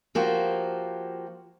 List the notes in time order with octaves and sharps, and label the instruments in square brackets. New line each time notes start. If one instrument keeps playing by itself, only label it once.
[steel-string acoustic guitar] F3 A#3 F#4 G4